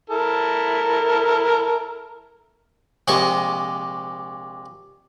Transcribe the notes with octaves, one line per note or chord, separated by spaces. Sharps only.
E4 A4 A#4
A#1 C3 G#3 D#5 C#6